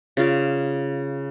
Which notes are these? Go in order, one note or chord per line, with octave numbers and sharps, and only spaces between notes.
C#3 F4 D5